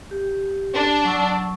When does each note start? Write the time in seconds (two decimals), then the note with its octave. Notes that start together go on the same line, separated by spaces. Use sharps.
0.11 G4
0.75 D4
1.05 F#3 C#6 E6